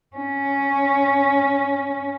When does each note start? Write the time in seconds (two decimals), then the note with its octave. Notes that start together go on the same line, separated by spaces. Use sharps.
0.17 C#4